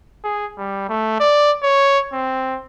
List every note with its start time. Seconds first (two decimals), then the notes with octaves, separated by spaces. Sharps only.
0.24 G#4
0.58 G3
0.89 A3
1.20 D5
1.63 C#5
2.13 C4